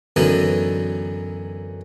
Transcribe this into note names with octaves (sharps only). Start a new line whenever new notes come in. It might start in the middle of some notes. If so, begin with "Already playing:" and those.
F#2 D3 E3 F#3 B3 D#4